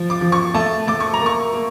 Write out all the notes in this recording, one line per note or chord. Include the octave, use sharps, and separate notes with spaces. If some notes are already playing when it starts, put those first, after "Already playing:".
Already playing: F3
D6
F3
C#6
A3 A5
A3 D6
C#6
A#5
A#3
C#6
A#3